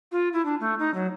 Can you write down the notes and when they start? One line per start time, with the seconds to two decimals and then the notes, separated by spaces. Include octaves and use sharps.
0.11 F4
0.33 E4
0.45 D4
0.60 A3
0.79 D#4
0.94 F#3